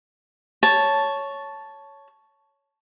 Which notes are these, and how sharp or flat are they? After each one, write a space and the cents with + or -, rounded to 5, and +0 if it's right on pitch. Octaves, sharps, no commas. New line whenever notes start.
C#5 +5 A5 -5